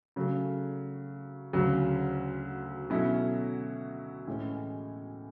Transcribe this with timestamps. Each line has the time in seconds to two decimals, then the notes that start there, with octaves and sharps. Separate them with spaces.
0.16 C#3 F#3 A3
1.53 D2 C#3 F#3
2.90 B2 F#3 A3 C#4 E4
4.27 A2 E3 G#3 C#4